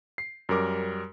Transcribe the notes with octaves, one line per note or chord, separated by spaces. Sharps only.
C7
F#2 G3 A#4 D6